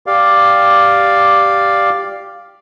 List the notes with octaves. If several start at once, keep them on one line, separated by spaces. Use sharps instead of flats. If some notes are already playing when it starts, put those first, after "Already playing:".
G4 D5 F5